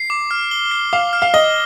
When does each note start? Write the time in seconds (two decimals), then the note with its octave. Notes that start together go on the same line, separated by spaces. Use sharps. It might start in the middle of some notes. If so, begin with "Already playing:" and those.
Already playing: C7
0.10 D6
0.31 F6
0.51 G7
0.71 C7
0.93 F5 D6
1.13 F6
1.22 F5
1.34 D#5 G7